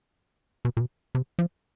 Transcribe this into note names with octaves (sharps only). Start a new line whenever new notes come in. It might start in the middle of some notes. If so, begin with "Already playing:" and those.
B2
A#2
B2
C3
F3